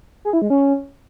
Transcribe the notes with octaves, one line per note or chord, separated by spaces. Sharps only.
G#4
E4
G#3
C#4